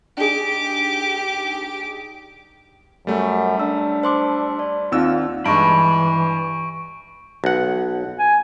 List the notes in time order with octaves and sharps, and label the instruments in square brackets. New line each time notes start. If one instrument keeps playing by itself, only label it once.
[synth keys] D4 D#4 G#4 [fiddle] G4 D6
[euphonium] F#2 [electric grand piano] G3 A3
[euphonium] D4 [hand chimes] E6
[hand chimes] C5 C6 D6
D5
[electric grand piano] D#2 E6 [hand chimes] C4 D#4 F6 [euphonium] F4
[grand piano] G2 G#3 [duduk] E3 [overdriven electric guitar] B5 [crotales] C#6 D7
[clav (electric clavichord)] B1 F#5
[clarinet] G#5